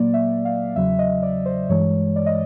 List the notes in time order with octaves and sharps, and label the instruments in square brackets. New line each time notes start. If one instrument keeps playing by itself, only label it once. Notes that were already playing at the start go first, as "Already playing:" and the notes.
Already playing: [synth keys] A#2 F#3 A#3 D5
E5
F5
E2 C#3 F#3 E5
D#5
D5
C5
G2 E3 G#3 C#5
D5
D#5